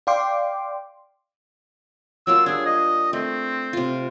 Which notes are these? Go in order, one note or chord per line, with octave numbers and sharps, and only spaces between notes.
D5 F5 G5 C6 D6
F#3 A#3 F4 E6
G3 D4 G#4
D#5
A3 C4
C3 F4